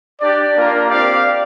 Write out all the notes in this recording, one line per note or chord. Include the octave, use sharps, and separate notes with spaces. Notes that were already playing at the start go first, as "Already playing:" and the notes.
D4 G4 D5
A#3 D4 F4 A#4
C4 G4 D5 F5